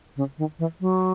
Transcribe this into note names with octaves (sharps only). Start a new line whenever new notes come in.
C#3
D#3
E3
F#3